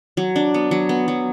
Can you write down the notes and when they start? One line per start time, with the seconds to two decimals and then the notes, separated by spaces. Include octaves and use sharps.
0.17 F#3
0.36 D4
0.54 B3
0.71 F#3
0.89 B3
1.08 F#3